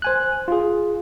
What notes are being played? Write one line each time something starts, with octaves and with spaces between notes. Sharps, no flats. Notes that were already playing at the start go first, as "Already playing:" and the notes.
C5 G#5 F#6
F4 G#4